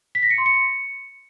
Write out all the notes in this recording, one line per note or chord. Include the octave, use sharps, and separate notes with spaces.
B6
A#6
C#7
C6
C#7